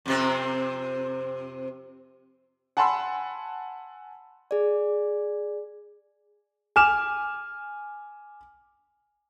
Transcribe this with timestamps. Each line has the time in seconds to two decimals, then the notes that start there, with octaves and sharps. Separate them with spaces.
0.06 F2 C3 C4
2.77 F#5 G#5 A5 B5 C6 E6
4.51 G#4 D5
6.76 G#5 D6 F6 E7